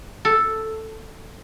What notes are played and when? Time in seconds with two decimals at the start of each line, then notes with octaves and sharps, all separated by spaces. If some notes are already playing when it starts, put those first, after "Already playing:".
0.25 A4